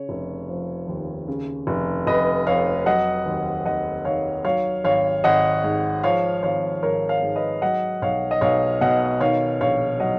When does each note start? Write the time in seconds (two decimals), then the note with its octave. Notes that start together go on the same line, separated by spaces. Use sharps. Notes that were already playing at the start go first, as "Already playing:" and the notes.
Already playing: C#3 C#5
0.09 F1
0.49 F3
0.88 D#2
1.28 C#3
1.67 F1
2.07 F1 B4 D#5
2.47 F2 C#5 F5
2.86 F#3 D#5 F#5
3.26 D#2
3.65 D#2 D#5 F#5
4.05 D#3 C#5 F5
4.44 F#3 C#5 F5
4.84 G#1 C#5 F5
5.24 G#1 D#5 F#5
5.64 G#2
6.03 F3 C#5 F5
6.43 G#1 C#5 F5
6.82 G#1 A#4 C#5
7.09 C#5 F5
7.22 G#2
7.36 B4 D#5
7.62 F#3 D#5 F#5
8.02 B1 C#5 F5
8.31 D#5
8.41 B1 C#5 F5
8.81 B2 D#5 F#5
9.20 D#3 C#5 F5
9.60 A#1 C#5 F5
10.00 F#3 D#5 F#5